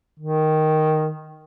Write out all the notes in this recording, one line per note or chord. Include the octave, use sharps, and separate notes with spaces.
D#3